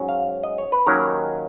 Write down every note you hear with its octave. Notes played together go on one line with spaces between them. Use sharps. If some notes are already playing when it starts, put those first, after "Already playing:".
Already playing: G#2 F#3 C#4
F5
D#5
C#5
B4
D#2 D#3 F#3 C#4 A#4